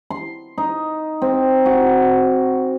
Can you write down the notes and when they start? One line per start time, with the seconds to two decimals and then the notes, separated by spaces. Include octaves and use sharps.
0.10 C6
0.58 D#4
1.22 C4
1.66 F#4